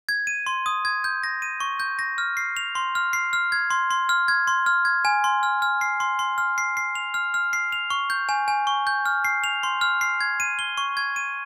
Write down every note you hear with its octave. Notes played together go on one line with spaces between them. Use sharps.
G#6
D#7
C6
D#6
G#6
G6
A#6
D#7
C#6
G6
A#6
F6
C7
F7
C6
F6
C7
F6
G#6
C6
C6
F6
G#6
C6
F6
G#6
G#5
C6
F6
F6
C7
C6
C6
F6
C7
C7
F7
F6
F6
C7
F7
C#6
G6
G#5
G#5
C#6
G6
F6
C7
F7
C6
F6
C7
G#6
D#7
G7
C#6
G#6
D#7